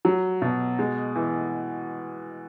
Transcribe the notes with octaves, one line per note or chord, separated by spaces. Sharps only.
F#3
B2
G#3
E3